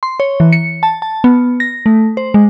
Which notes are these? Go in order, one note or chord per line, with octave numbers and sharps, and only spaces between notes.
C6
C#5
E3
C#7
A5
A5
B3
A#6
A3
C5
G#3